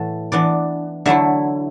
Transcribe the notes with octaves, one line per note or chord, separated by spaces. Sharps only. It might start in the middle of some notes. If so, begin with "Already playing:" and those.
Already playing: A2 E3 A3 F#5 A5
E3 B3 D4 D5
D3 F#3 A3 E4 E5